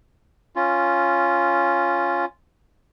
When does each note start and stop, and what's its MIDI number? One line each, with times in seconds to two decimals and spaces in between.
0.56 2.25 61
0.56 2.25 65